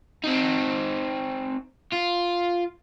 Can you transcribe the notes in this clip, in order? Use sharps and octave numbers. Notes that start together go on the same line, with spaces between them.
C4 D#4
F4